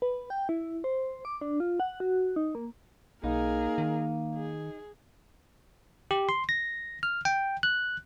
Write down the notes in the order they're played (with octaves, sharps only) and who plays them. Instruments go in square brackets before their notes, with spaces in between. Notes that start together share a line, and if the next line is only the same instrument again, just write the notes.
[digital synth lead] B4
G5
E4
C5
D6
D4
F4
F#5
F#4
D#4
A#3
[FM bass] B1 [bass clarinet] A#3 [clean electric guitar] D#4 [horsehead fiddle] G#4 A#4
[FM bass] D#3
[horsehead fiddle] G#4
[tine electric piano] G4
C6
A#6
F6
G5
F#6